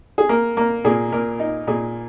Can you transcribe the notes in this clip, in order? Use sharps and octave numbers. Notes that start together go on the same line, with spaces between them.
G#4
A#3 A#4
A#3 A#4
A#2 G#4
A#2 A#4
D#4
A#2 G#4